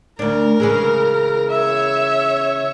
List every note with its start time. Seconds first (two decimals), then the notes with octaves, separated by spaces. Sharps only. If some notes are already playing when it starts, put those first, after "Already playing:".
0.19 D2 D4 A#4
0.60 C#3 E3 G#3
1.51 C#5 E5